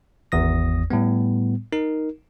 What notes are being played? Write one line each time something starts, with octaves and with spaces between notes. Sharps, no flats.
G#1 E2 D#6 A#6
A2 G3 B3
D#4 A#4